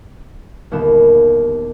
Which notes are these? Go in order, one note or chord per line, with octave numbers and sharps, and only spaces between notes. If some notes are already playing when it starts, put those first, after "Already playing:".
G1 D#2 A#2 B3 E7